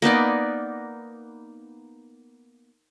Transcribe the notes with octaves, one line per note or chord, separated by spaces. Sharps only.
A#3 B3 D#4 D5